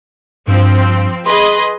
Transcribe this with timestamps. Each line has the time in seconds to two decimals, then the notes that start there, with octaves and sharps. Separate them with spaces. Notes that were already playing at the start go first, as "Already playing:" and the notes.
0.47 G2 F3 C4
1.26 G#4 B4 D#5 C6